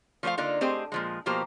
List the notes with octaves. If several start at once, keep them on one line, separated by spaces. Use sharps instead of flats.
F3 A3 B4 C5 F5
D3 A#3 D4 D#4 F4
A3 C4 G4 G#4 C5 D#5
A#2 F3 G#3
B2 F3 A#3 G4 C5 A#5